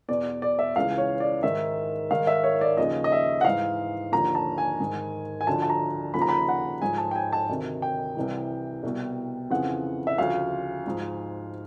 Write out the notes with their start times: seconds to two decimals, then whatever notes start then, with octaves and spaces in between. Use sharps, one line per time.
0.08 E2 B2 D5
0.42 D5
0.59 E5
0.76 C#2 C#3 E3 F5
0.98 C#5
1.20 D5
1.43 G#2 D#3 E5
2.11 G#2 D#3 F5
2.27 E5
2.44 C#5
2.61 D5
2.77 D#2 C#3 F3 D#5
3.04 D#5
3.12 E5
3.41 F#5
3.45 G#2 E3 F5
4.12 D#2 D3 F3 A#5
4.35 A5
4.58 G#5
4.80 G#2 D#3
5.41 G#5
5.47 D2 D3 F3 A5
5.62 A5
5.70 A#5
6.14 D#2 C#3 F3 B5
6.22 A#5
6.29 B5
6.48 F#5
6.82 G#2 F3 G#5
6.98 A5
7.11 G5
7.16 G#5
7.33 A5
7.49 D2 C3 D#3
7.82 G5
8.17 C2 C3 E3
8.83 C2 B2
9.50 F2 C#3 E3 F#5
10.07 E5
10.18 D2 C#3 F3 F5
10.86 G#2 F3